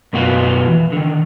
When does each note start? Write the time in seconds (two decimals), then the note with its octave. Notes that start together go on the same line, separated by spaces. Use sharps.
0.13 F#2 B2 B3 F4 F#4 B4
0.68 E3
0.92 D3 D#3